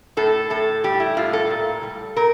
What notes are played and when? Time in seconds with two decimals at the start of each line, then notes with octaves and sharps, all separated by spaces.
0.17 A2 A4
0.50 A2 A4
0.84 G3 G4
1.00 E4
1.17 A2 F4
1.33 A4
1.50 A#2
1.83 G3
2.17 A#2 A#4